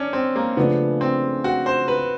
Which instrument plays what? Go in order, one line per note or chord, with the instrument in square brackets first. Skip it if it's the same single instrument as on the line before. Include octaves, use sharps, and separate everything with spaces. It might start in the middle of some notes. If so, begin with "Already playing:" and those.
Already playing: [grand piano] C#4 D4
C4
A#3
[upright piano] C#3 F3 A3 D4 [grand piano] B3
[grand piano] C4
F#4
C5
B4